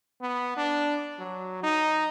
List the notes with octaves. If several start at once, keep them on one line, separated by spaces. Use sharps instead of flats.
B3
D4
F#3
D#4